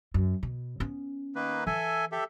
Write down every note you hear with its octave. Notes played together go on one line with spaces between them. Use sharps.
F#2
B2
B3 C#4
D#3 A#3 B4
E3 A4 E5 G#5
G4 A4 E5